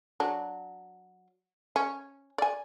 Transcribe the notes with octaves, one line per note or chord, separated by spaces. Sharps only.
F#3 D4
C#4
D5 G#5